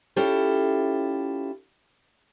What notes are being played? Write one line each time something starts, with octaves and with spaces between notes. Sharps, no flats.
C#4 E4 F4 G4 A4